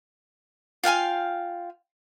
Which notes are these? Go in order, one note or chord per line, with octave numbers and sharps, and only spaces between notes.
F4 F5 G5 G#5